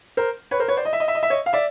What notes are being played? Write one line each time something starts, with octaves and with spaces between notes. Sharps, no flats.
A#4 C5
B4 C#5
A#4 C5
B4 C#5
C5 D5
D#5
E5
D#5
E5
D#5
E5
C#5 D#5
F5
D5 E5